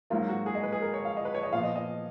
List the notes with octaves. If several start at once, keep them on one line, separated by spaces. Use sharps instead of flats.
G#2 F#3 A#3 F4
F#4
G#4
D#5
B4
G#4
A#4
C#5
F5
D#5
B4
C#5
D#5
A#2 F3 B3 F5
D#5
D#5